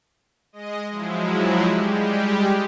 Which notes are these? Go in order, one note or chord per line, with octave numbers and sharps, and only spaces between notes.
G#3 D#5
F3 F#3 G#3 E4
G3 G#3 G4